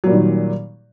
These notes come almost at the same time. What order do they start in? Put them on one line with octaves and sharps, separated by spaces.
F#3 A#2 G3 D#3